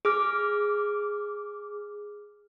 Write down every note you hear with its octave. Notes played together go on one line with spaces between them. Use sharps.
G#4 D6 F6